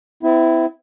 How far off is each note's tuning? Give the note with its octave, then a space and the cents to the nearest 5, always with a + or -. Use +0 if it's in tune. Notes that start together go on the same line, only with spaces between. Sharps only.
C4 -40 E4 +0